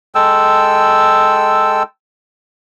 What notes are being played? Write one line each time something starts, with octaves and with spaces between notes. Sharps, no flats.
G#3 A4 G5 E6